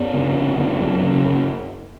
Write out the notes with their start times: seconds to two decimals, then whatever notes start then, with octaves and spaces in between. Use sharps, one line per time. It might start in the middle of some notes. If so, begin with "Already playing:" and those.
Already playing: F#2 B3
0.13 C#3
0.35 F#1
0.57 F#1
0.80 F#2
1.03 C#3
1.25 F#1